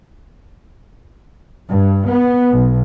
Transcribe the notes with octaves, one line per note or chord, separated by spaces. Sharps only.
G2
B3
B1